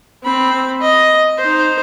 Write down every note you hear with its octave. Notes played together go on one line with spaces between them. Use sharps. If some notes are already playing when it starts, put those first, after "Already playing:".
C4 B5
D#5
D#4 C5